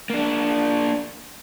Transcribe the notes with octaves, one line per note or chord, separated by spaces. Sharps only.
A#3 D4